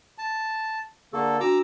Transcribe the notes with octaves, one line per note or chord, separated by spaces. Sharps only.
A5
D3 A#3 G#4 A4
D4 F#4 A#5 D6 E6